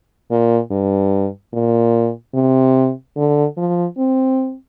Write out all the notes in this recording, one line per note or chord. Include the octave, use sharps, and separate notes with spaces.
A#2
G2
A#2
C3
D3
F3
C4